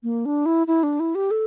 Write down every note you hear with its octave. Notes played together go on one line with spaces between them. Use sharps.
A#3
D4
E4
E4
D4
E4
G4
A4